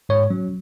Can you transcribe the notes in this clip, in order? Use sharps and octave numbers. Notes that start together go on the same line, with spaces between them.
G#2 C#5
F#3 C#4